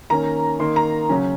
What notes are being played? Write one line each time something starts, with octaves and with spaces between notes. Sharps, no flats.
D#3 A#3 C#4 A#5
D#3 A#3 D#4 C6
A#5
C#3 F#3 C#4